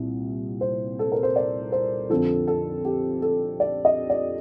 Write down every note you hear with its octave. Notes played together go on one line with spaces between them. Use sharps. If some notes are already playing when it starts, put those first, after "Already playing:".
Already playing: C2 A#2
C5
A4
A#4
C5
D5
C5
F2 D3 F3 A4
A4
G4
A4
D5
D#5
D5